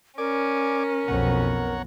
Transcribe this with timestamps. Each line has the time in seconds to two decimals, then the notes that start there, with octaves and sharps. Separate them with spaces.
0.18 C#4 A#4 D5 G#5 D6
1.08 B1 F2 B3 C#5 F#5 A#5